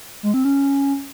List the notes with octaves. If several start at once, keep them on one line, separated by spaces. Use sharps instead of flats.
G#3
C4
C#4